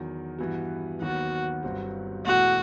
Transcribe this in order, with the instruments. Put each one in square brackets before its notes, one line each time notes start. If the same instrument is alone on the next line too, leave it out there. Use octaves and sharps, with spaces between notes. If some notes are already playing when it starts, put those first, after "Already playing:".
Already playing: [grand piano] E2 D#3 F#3
G2 E3 B3 F#4
[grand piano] D#2 D#3 F#3 B3 [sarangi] F#4
[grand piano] G1 G2 F#3 C4 F#4
[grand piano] E1 E2 B2 A3 E4 [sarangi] F#4